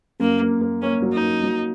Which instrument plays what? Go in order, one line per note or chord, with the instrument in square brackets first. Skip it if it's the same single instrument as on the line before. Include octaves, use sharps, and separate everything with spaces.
[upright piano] F#2 [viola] A#3
[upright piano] A#3
A#3
[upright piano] A#3 [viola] C#4
[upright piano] F#3
[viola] D#4
[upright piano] A#3
F#3